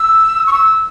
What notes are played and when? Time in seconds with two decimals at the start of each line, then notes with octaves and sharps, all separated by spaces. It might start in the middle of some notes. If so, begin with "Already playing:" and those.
Already playing: E6
0.47 C#6
0.53 E6